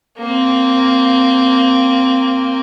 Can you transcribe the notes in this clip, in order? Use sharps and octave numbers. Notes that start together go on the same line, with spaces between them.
A#3 C4